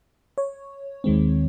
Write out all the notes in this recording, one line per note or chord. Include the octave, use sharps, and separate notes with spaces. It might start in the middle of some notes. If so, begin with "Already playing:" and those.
C#5
D#2 D#3 G#3 C4